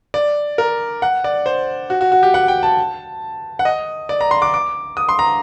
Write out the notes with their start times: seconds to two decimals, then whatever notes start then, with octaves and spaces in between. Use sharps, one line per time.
0.14 D5
0.58 A#4
1.02 F#5
1.24 D5
1.46 C5
1.90 F#4
2.01 F#4
2.12 F#4
2.23 G4
2.34 F#5
2.48 G5
2.63 A5
3.59 F#5
3.65 D#5
4.09 D5
4.21 A#5
4.31 C6
4.42 D6
4.54 D6
4.97 D#6
5.09 C6
5.19 A#5